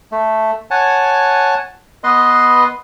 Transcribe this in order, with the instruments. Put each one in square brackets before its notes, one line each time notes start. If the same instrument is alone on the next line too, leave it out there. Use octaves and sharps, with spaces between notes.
[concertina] A3
C#5 F#5 G#5 A5
B3 B4 D#5 C6